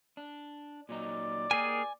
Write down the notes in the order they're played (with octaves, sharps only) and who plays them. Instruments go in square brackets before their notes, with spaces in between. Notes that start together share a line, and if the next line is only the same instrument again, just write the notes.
[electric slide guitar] D4
[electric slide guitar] A#2 F#3 D#4 [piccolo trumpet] D5
[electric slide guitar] A#3 G4 [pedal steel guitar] G#4 A#4 [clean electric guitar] G#5